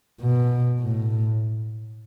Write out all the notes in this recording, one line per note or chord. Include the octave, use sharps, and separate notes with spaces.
B2
A2